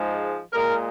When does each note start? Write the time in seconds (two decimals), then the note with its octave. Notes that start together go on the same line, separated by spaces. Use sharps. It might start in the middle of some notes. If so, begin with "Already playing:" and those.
Already playing: G#2 F3 G#3
0.52 A#2 G#3 A#4